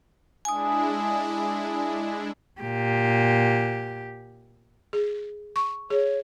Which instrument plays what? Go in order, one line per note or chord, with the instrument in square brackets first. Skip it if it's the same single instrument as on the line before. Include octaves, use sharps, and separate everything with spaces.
[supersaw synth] G#3 D4 E4 [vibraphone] G#5 D#6
[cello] A#2 G4
[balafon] G#4
C#6
[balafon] G#4 [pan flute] C#5